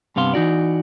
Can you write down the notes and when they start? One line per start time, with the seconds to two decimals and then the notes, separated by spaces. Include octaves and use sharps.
0.16 G2 C3 B3 F5 C6
0.34 E3 D#4 F#4 D5